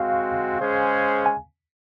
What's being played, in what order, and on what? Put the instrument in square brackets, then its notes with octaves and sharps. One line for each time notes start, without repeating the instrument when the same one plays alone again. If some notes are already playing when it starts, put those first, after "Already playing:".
Already playing: [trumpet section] G#3 C4 F#4 [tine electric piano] F5
[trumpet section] G#3 C#4 G#4 C5
[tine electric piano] G#5